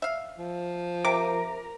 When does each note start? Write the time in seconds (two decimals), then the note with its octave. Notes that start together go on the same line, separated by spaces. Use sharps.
0.02 E5 F5
0.39 F3
1.05 C3 A#4 D6